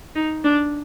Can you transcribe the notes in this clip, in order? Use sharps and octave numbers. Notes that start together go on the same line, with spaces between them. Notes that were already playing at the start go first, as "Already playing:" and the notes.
D#4
D4